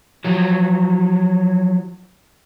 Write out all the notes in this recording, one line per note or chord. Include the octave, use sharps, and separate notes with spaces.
F3 F#3